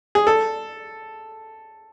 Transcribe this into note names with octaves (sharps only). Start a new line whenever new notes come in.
G#4
A4